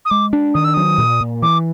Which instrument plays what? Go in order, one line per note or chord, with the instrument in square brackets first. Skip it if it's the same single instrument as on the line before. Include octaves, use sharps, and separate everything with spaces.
[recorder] D#6
[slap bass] G#3 [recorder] D6
[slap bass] D4
[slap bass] D#3 [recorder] D#6
[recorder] E6
[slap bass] F#3 [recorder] D#6
[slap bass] A#2
A#2
[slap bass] E3 [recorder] D6